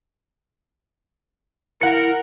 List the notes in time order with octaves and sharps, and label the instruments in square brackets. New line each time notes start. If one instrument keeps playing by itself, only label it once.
[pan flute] E4 [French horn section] A#4 [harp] F#5 C#7